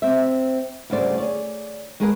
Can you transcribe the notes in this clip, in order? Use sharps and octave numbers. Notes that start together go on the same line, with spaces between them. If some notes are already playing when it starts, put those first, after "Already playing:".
C4 E5
D2 G2 C#3 A3 C5 D5
G#4 C#5 D5
G#3 A3 G#4 A#4 B4 F#5